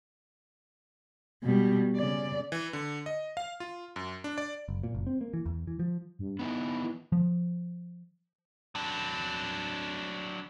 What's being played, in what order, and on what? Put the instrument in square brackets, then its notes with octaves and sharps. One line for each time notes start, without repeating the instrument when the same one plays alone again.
[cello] B2 G3
C#3 D5
[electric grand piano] E3
D3
D#5
F5
F4
F#2
D4
D5
[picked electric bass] F#1
A#2
F#1
C4
A#3
E3
E2
E3
F3
[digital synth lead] G2
[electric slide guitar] B3 D#4 E4 [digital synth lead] B4
[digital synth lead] E3
[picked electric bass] F3
[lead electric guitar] F#3 D4